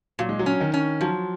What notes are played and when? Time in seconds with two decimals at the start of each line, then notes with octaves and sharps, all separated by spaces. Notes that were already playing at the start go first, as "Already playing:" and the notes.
0.19 A#2 F#3
0.29 G#3
0.39 F#3
0.46 C#4
0.60 D#3
0.74 C#4
1.01 F3 F#3